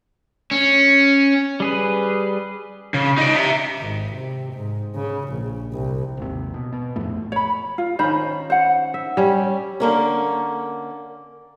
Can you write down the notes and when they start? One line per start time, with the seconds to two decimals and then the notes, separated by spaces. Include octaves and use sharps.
0.51 C#4
1.60 G3 G#4 B4
2.94 C#3
3.18 D#4 D5
3.36 E5 A#5
3.78 G#1
4.13 C3
4.54 G#2
4.96 C#3
5.29 A#1
5.73 C2
6.17 G#1 D#2 C3
6.54 B2
6.72 B2
6.96 A#1 F2 A2 A3
7.32 C#5 B5
7.78 F4
7.99 D#3 C#4 C5 B5
8.50 C5 F#5
8.94 E5
9.17 G3 C#4
9.80 D3 A#3 C#4